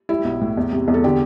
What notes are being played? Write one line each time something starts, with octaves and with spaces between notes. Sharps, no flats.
G3 E4
B1
A2
E2
C3
E2
A4
D3 G4